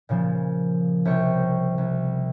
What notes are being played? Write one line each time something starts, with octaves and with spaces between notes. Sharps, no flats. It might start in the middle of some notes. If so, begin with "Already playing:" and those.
A#2 C#3 F3
C2 C3 C#5 G5 C#6
C2